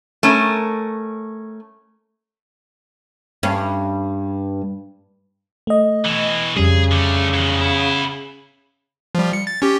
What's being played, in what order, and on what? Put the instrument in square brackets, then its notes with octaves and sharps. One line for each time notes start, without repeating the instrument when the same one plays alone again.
[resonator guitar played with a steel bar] A3 C#4 A#4
[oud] G2 C#4
[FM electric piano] A3 D#5
[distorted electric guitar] B2 E3
[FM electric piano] F2 G3 [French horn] C#3 [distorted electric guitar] G#4
[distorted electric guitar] D3 A3
E2 D#3
B3 E4
[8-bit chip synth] F3 G3
C#7
A6
C#4 G4